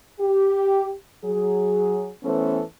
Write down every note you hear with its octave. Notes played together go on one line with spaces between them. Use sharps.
G4
F#3 G#4
E3 A3 B3 C#4 A4 C5